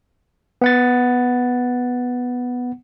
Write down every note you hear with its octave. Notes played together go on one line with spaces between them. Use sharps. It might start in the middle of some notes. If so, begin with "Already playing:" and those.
B3 F#5 A6